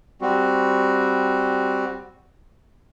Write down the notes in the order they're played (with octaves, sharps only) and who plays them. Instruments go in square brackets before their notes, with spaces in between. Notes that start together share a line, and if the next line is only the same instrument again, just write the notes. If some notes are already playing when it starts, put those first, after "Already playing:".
[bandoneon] G3 C4 F#4